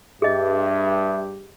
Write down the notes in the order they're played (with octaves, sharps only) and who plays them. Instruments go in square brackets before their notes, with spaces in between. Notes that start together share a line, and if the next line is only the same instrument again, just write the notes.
[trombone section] G2 [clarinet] G4 [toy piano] G#4 D#5 [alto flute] E5